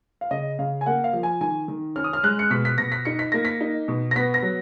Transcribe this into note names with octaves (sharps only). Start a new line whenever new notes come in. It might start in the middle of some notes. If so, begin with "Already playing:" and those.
F5
C#3 D#5
C#3 F5
G#5
A#3 F#5
F5
F3
G#5
D#3 G#5
D#3
C#4 F6
D#6
F6
G#3 F#6
C#7
B2 B6
B6
B2 A#6
B6
D#4 C#7
B6
A#3 A#6
B6
D#4
B2
A#6
B3 B6
A#6
F#3